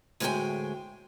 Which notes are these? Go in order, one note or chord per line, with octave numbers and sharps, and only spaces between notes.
D2 A2 G#3 F#4 G5 G#5